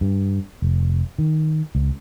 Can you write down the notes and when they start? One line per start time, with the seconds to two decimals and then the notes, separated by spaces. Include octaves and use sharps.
0.01 G2
0.62 F1
1.18 D#3
1.75 C#2